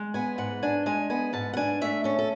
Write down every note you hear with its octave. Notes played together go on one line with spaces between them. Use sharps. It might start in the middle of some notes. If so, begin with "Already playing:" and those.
Already playing: G#3
B3 G#5
G#2 F#5
D4 G#5
G#3 G#5
B3 G#5
G#2 A5
F#5
D4 G#5
A3 E5
C#4 A4
A4